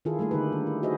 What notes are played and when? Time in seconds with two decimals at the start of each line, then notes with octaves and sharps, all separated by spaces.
0.05 D#3 E4 F4 G#4 A4
0.19 G3 A3 A#3 A4
0.31 D3 D#4 G4 B4
0.52 D4
0.67 E4
0.83 F#4 G#4 B4 C5 D#5 E5